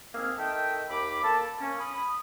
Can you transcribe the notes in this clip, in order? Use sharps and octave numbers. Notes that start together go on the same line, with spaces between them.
G#2 A#3 C4 G#4 E6 F6
D#3 A4 D#5 E5 G5
D#2 B5 D6
A#3 A4 A5
A#3 C#4
B5 D#6